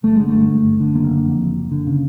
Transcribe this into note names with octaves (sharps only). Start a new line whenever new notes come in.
G1 A3
D3 G#3
A3
G2
G1
G1
D3
F#1 A#3
D3
F2
F#1
F#1
D3
C#3